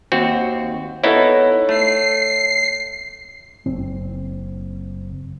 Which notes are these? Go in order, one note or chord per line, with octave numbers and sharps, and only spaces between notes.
D#2 C4 F#4
B3 D#4 E4 A4 C#5
A3 C7
F#1 C4